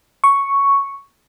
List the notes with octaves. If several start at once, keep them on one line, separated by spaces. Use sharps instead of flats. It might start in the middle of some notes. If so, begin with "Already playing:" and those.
C#6